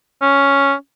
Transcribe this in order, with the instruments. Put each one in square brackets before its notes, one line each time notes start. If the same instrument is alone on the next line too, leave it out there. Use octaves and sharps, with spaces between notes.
[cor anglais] C#4